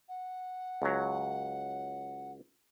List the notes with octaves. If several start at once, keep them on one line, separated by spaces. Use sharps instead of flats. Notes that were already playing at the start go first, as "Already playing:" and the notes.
F#5
C#2 F#3